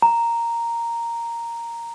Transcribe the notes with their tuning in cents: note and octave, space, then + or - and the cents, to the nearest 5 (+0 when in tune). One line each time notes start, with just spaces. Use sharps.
A#5 -5